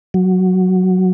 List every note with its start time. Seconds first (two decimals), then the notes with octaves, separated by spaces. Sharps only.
0.14 F#3